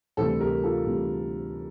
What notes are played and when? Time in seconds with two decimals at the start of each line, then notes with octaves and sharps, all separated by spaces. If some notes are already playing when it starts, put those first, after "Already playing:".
0.17 D2 C3 E3 G3 A4 C5
0.40 G4 A#4
0.63 F4 A4
0.86 D2 C3 E3 G3